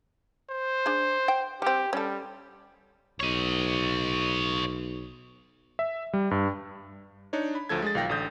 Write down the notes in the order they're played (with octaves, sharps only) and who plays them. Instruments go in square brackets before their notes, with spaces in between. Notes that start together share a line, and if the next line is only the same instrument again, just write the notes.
[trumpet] C5
[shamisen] D4 G#4
G5
[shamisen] G3 C4 [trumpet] G4
[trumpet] G3 [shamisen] C#4 A4
[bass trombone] B1 [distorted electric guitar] C#5 D#5
[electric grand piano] E5
G3
G2
D4 D#4 C#5
B5
D2 F3 A3 A4 G#6
G#3 G#4 A6
B1 D#3 F4 F5 G5 A#6
A1 D3 D#6 G6